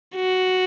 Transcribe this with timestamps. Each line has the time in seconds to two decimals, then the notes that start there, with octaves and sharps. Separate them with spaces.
0.15 F#4